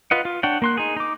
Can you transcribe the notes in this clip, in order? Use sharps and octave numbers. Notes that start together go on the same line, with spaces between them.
F4 B4 D#5 F#5
F4
D4 C#5 F#5 G5
A#3 C6 F#6
D#4 G#4
D#4 D6